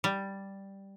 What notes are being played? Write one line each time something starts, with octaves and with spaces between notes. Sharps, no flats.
G3